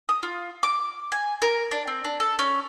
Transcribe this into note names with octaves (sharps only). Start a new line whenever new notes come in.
D#6
F4
D6
G#5
A#4
D4
C4
D4
A4
C#4